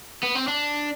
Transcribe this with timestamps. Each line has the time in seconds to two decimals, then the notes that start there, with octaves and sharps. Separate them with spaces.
0.23 B3
0.35 C4
0.48 D4